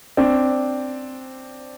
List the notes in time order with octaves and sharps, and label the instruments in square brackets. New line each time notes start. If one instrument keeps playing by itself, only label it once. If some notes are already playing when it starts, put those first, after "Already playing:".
[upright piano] C4 D4